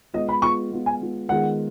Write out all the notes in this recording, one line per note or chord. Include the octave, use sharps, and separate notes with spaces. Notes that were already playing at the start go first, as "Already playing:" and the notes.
G#3 B3 F4 D#5
B5
G#3 B3 F4 C#6
G#3 B3 F4
G#5
G#3 B3 F4
D#3 G#3 B3 F4 G#4 F#5